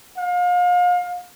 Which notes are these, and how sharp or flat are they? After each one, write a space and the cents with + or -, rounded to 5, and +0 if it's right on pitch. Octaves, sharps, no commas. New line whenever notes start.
F5 +35